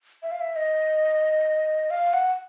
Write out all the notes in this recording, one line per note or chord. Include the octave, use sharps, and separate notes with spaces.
E5
F5
E5
D#5
F5
F#5